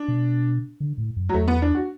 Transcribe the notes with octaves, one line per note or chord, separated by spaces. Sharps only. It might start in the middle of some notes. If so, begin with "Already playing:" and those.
Already playing: D4
B2
D3
A2
F#2
F#3
E2 A3
B3
D4
F#4